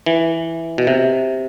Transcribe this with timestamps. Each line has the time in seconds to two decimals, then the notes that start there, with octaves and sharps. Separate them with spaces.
0.06 E3
0.78 B2
0.87 C3